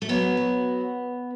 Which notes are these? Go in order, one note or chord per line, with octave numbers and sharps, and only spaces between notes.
A3
F#3 B3
F#3